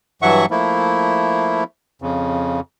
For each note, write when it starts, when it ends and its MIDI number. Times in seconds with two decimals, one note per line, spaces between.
0.22 0.46 43
0.22 0.46 52
0.22 0.46 54
0.22 0.46 76
0.22 0.46 78
0.22 0.46 85
0.50 1.64 53
0.50 1.64 57
0.50 1.64 58
0.50 1.64 64
2.02 2.60 41
2.02 2.60 49